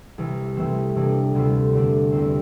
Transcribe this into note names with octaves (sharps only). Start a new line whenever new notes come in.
C2 C3 E3
C2 C3 E3 A3 C4
F2 C3 E3 A#3 D4
D2 C3 G3 C4 F4
E2 D3 A3 D4
E2 C3 G3 C4